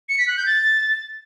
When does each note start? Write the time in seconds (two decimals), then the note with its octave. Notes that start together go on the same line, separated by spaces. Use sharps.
0.09 C#7
0.18 B6
0.28 F#6
0.37 G6
0.46 A6